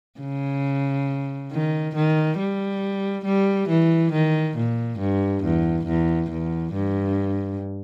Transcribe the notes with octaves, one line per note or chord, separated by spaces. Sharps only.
C#3
D#3
D#3
G3
G3
E3
D#3
A#2
G2
E2
E2
E2
G2